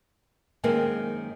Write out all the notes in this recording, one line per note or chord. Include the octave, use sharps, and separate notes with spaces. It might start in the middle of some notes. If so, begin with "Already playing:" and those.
F#2 D#3 G#3 A#3 C4